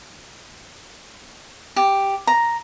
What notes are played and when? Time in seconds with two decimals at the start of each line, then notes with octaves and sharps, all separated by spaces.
1.76 G4
2.27 A#5